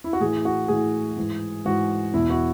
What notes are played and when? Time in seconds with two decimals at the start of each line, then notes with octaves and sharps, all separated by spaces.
0.04 E4
0.13 F#4
0.20 A2 E3 G#4
0.45 F#4
0.68 A2 E3 G#4
1.16 G#2 E3
1.65 G#2 E3 F#4
2.13 E2 B2 E4
2.30 F#4